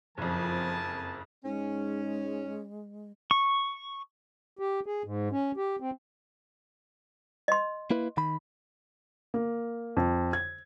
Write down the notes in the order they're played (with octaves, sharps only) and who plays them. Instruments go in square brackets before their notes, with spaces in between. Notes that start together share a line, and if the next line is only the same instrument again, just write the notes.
[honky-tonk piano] F#1 F2 [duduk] F3 [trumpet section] A#4 G#5 A5
[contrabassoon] G#2 [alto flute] G#3 [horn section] C#4
[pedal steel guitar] C#6
[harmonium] G4
G#4
G#2
C#4
G4
C4
[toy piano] D#5 C6
[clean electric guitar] A#3 E4 B4
D#3 B5
[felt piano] A#3
F2
G#6